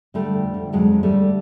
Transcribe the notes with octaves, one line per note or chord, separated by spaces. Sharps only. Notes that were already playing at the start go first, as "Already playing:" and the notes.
D3 G3 A3
F2
D3
F2 F#3 G#3
D3
G3 A3
D3